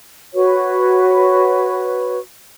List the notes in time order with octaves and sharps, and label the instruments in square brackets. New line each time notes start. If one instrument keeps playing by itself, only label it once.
[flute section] F#4 B4 C#5